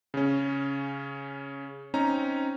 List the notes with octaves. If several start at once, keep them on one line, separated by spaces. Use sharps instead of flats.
C#3 C#4
C4 C#4 D#4 A#5